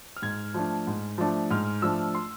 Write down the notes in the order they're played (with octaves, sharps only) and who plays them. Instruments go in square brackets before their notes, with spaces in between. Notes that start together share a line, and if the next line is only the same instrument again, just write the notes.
[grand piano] F6
G#2 G#6
F3 A3 D4
G#2
F3 A3 D4
G#2 F6
F3 A3 D4 E6
C6